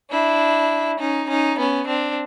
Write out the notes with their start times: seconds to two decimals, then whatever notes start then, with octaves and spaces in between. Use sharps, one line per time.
0.11 D4 E4
0.99 C#4 D#4
1.28 C#4 D#4
1.58 B3 C#4
1.88 C4 D4